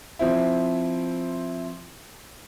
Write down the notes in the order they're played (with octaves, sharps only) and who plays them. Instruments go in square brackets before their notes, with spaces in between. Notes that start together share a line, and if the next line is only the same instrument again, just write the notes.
[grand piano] F3 C4 E4